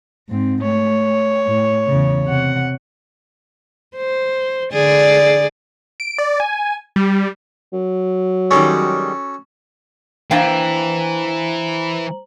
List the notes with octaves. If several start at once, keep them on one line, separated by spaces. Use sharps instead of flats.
G#2 C4
A3 C#5
A2
E2 C#3
C3 F#5
C5
D3 G#4 D5
D7
D5
G#5
G3
F#3
D#3 G3 G#3 C#4 F#4 A4
E3 A#3 D4 E4 C5 G5 A#5